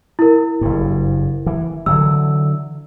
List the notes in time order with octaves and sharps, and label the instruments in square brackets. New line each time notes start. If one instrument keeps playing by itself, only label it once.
[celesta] E4 A#4
[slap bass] F#1 G2
E3
[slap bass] D3 E3 F#3 [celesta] E6